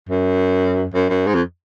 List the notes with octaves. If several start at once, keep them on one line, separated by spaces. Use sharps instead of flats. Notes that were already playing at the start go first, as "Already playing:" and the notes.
F#2
F#2
F#2
G#2
F2